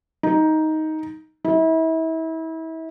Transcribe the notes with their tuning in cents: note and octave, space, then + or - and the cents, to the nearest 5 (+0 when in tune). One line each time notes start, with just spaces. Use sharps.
D#4 +10
E4 -35